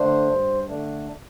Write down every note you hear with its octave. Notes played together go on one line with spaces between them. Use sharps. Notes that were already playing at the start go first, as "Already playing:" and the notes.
Already playing: D3 A3 D4 C5
G2
D3 A3 D4